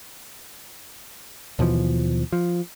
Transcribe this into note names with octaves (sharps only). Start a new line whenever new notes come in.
D#2 B2 E3 F3
F3